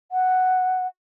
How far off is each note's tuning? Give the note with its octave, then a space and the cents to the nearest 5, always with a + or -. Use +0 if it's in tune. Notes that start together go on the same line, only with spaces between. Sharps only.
F#5 +0